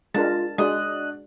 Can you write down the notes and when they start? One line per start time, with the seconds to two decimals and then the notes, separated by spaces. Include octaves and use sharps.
0.15 G#3 D4 F4 A#4 A5
0.58 G#3 D4 F#4 D5 D#5 F#6